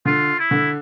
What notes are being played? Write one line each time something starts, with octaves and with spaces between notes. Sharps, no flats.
D3 F4
E4
D3